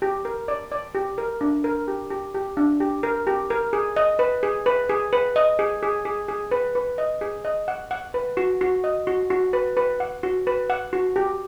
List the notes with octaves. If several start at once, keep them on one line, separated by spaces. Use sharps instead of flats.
G4
A#4
D5
D5
G4
A#4
D4
A#4
G4
G4
G4
D4
G4
A#4
G4
A#4
G#4
D#5
B4
G#4
B4
G#4
B4
D#5
G#4
G#4
G#4
G#4
B4
B4
D#5
G#4
D#5
F#5
F#5
B4
F#4
F#4
D#5
F#4
F#4
B4
B4
F#5
F#4
B4
F#5
F#4
G4